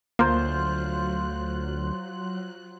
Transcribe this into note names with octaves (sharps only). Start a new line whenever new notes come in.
D2 F#3 A#3 F4 C5 F#6